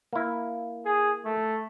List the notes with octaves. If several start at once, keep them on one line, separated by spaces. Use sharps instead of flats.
A#3 E4
G#4
A3